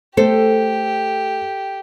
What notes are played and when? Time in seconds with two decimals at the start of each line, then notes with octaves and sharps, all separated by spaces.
0.17 A3 G4 A4 C5